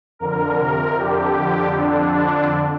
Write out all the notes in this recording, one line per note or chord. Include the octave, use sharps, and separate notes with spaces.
F2 D3 A#4
F2 C3 A#4
F2 D3 G4
F2 D3
F2 D3 D4
F2 D3 D4